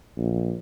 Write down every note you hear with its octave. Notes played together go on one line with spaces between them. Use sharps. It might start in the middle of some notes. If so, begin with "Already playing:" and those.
A#1